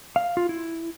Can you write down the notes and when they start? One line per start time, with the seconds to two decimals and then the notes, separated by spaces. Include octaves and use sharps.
0.16 F5
0.37 F4
0.49 E4